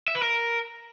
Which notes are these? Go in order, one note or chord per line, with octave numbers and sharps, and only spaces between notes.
E5
B4
A#4